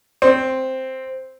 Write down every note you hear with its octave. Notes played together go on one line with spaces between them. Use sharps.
C4